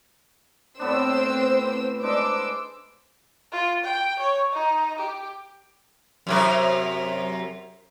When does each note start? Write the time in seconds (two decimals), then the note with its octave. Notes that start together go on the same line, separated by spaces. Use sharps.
0.79 A2 B3 C4 D4 C5 E6
2.03 G#3 D4 C5 D6 E6
3.52 F4
3.84 G5
4.19 C#5
4.52 D#4
4.99 G4
6.27 F#2 C3 A#4